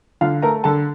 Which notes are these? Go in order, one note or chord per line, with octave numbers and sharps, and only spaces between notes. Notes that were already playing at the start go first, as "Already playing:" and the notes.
D3 F4 F5
A3 A#4 A#5
D3 A4 A5